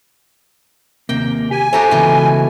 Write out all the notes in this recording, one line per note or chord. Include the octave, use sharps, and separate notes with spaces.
D#2 C3 A#3 G5
G4 G#5
A3 F#4 G4 C5 A#5
C#2 B2 E3